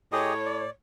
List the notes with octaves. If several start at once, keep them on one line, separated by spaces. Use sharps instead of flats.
A2 G4 G#4 C#5 D#5
D5